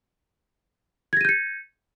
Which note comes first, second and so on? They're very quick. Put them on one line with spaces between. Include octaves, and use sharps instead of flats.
G#6 A#6 D#7 G6 C#7